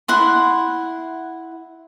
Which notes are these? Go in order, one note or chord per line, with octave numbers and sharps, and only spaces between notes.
E4 F#5 C6